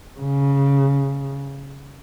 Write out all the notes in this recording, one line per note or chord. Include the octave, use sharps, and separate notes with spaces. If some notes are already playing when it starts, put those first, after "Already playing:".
C#3